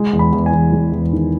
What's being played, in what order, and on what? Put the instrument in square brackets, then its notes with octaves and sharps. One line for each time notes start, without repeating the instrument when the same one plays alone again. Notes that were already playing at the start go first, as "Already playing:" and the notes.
Already playing: [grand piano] G#3
E2
B5
E2
G#5
E2
G#3
E2
D#3